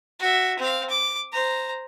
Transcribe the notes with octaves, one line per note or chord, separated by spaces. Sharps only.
F#4 E5
C4 F5
D6
C5 A#5